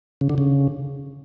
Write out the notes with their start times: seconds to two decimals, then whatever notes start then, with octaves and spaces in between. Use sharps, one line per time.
0.21 C#3
0.30 D3
0.38 C#3